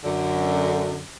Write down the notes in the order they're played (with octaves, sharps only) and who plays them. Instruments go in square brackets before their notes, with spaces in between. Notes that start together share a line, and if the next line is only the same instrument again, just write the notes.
[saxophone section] F#2 D3